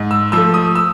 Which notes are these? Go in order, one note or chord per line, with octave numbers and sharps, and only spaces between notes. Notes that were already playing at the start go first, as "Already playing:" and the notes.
Already playing: G#2
E6
F3 A3 E6
D#6
E6